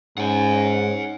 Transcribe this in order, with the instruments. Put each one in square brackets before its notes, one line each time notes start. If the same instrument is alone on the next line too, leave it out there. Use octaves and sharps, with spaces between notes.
[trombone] G#2 [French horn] C#4 [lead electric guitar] F#5 G#5